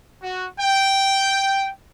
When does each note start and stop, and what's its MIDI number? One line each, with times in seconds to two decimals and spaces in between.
0.23 0.48 66
0.61 1.71 79